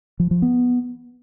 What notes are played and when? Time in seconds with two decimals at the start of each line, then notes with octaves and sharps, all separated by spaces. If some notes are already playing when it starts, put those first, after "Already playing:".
0.20 F3
0.31 F3
0.42 B3